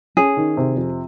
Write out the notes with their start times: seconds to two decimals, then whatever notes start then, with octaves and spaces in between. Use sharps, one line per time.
0.17 C#4 G#4
0.37 D#3
0.57 C3
0.76 F2